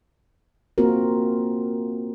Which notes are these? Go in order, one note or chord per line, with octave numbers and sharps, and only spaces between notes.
A#3 C4 F4 F#4 A#4